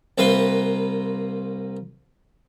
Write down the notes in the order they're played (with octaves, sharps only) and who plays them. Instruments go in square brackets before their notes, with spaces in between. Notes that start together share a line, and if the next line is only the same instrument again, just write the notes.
[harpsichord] C2 A#3 C4 B4 B5 C6